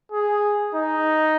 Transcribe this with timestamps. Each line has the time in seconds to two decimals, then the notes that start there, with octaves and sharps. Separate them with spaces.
0.12 G#4
0.75 D#4